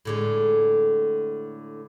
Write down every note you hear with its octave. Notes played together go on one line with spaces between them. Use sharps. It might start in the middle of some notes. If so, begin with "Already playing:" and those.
A2 D3 G#3